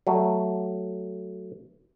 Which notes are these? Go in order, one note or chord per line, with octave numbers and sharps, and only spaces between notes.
F#3 A3